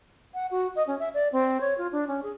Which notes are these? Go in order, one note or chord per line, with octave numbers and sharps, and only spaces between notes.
F#5
F#4
D#5
C#4
E5
D5
C4
C#5
F4
D4
C#4
G#4